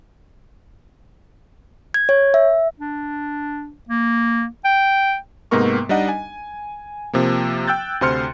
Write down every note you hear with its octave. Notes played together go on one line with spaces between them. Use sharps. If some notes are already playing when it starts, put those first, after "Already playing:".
G#6
C#5
E5
D4
A#3
G5
G#2 C3 A#3 B3 A#4 C#6
G3 D4 D#4 D#5 F#5
G#5
C3 F3 A#3
G5 E6 F#6 G6 A6
D2 C3 C5 C6 F6 C#7